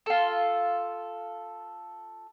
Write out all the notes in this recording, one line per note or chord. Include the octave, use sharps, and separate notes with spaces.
F4 A4